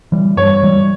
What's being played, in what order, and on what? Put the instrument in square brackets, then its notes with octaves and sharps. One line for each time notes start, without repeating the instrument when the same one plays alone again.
[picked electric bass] E3 G3
[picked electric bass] G2 [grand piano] C#5
[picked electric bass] E3 G3